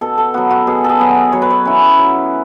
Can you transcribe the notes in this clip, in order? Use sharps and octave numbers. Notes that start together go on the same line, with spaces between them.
B2 A4
A4
F#3 B3 F#4
F#4
B2 G#4
A4
G#4
F#3 B3
F#3 C#5
B4
C#5
C#4 E4
F#3